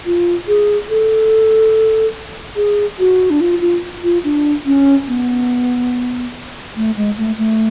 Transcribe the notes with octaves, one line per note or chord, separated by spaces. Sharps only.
F4
G#4
A4
G#4
F#4
D4
F4
F4
F4
D4
C#4
B3
A3
G#3
A3
A3